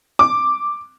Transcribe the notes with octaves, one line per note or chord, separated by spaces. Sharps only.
D6